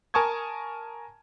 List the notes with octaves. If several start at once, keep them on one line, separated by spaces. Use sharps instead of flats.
A#4 G#5 A5 C#6 D#6 G#6